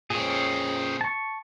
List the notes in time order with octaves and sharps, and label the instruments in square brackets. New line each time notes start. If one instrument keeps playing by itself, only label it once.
[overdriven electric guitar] A#2 C4 [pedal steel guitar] C#4 G#4
[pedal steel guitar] A5 C#6